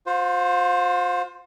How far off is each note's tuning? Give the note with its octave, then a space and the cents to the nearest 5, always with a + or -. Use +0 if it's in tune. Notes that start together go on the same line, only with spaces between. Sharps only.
F4 +40 C5 +0